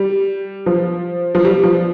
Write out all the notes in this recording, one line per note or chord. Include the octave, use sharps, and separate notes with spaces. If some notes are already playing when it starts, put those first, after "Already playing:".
Already playing: G3
F3
F3
G3
F3